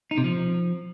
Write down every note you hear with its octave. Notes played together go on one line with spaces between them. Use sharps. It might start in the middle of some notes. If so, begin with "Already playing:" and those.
D#4
C3
F3